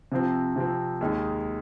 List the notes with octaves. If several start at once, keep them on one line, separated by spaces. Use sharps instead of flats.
C3 F3 C4
C3 F3 C4
D#2 D#3 G#3 D#4